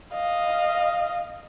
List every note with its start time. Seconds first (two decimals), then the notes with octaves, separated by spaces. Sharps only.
0.14 D#5 F5